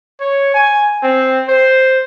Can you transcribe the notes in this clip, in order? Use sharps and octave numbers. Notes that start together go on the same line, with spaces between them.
C#5
G#5
C4
C5